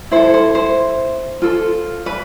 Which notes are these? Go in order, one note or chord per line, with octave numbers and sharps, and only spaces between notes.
E4 A4 C5
C5
C5
F4 A4
B4